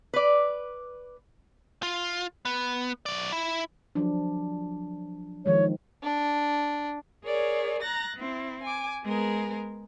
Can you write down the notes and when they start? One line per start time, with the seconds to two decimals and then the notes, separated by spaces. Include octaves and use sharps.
0.13 B4 D5
1.83 F4
2.45 B3
3.06 F#3 D5
3.32 E4
3.95 F3 F#3 D4
5.46 D#3 F3 G#3 C#5
6.03 D4
7.24 G#4 A#4 C#5 D5
7.82 A#5 F#6 A6 A#6
8.16 C4 E4
8.63 G#5 D6
9.04 G#3 B3 G#4 A#4